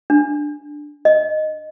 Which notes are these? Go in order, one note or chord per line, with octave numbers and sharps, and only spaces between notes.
D4
D#5